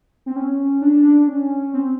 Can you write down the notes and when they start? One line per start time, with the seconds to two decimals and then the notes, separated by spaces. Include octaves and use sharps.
0.26 C4
0.36 C#4
0.82 D4
1.27 C#4
1.73 C4